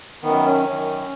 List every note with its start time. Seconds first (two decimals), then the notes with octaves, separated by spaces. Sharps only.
0.22 F#2 D#3 B3
0.44 C#4
0.65 F#2 D#3 C#4